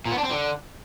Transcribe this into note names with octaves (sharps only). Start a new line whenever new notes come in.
A#2
B3
D4
C4
D3